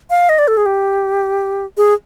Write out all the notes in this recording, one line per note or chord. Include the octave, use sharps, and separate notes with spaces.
F5
D#5
D5
A4
G#4
G4
G#4